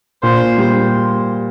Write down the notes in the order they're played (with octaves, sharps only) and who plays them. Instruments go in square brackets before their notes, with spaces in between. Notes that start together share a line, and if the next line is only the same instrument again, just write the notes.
[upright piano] A#2 [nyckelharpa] C5
[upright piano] G3